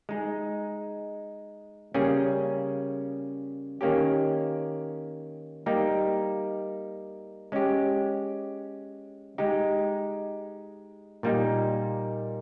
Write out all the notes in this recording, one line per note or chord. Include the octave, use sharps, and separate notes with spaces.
G#3 D#4 G#4
C#3 G3 A#3 C#4 G#4
D#3 A#3 C#4 G4
G3 A#3 D#4 G4
G#3 C#4 G4
G#3 D#4 G4
A#2 G3 A#3 D#4